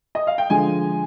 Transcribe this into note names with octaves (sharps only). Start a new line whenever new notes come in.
D#5
F5
G5
D3 F3 G#3 G#5